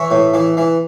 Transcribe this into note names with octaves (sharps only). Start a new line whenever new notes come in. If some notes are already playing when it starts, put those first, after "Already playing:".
Already playing: E3 C#5 E5
A2
E3
E3